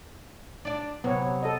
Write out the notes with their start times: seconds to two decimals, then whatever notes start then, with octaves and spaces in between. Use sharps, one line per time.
0.65 D4 D5
1.04 C3 F#3 B3 C#5
1.43 A4 D#5